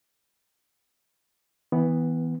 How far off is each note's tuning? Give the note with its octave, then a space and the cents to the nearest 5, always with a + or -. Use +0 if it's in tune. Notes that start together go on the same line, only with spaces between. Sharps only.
E3 -25 B3 +0